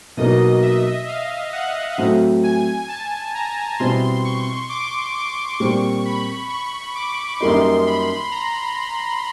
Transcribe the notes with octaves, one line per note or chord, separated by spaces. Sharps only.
B2 F#3 A#3 D#4 D#5
E5
F5
F#5
A2 F#3 A3 C4
G#5
A5
A#5
B2 G3 C4 E4 C6
C#6
D6
D6
A#2 G3 C4 C#6
B5
C#6
D6
F#2 D#3 G3 A#3 D#4 C6
B5
A#5